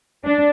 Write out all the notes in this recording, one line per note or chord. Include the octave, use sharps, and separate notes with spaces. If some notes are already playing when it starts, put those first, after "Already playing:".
D4